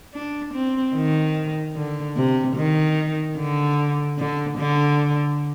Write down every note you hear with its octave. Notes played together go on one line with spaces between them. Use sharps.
D4
C4
D#3
D3
C3
D#3
D3
D3
D3